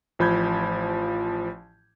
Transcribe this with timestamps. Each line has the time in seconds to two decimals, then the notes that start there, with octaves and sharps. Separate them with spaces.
0.19 A1 F3 B5 G6 G#6